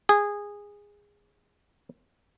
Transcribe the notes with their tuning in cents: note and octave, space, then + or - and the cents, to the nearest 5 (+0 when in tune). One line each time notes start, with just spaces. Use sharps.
G#4 -15